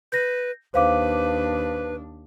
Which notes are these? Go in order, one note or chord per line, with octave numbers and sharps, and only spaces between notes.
B4 G6 A#6
D#2 D4 B4 C5 F5 D6